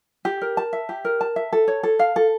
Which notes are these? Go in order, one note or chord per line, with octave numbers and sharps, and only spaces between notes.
G4
A#4
A5
E5
G4
A#4
A5
E5
A4
C#5
A4
F5
A4